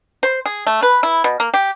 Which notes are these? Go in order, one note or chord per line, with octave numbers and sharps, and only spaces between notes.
C5
G#4
A3
B4
E4
B2
A#3
G4